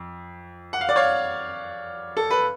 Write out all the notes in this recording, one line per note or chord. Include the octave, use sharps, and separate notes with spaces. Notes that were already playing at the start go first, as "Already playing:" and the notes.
Already playing: F2
F#5
F5
D5
C#5 F5
A4
B4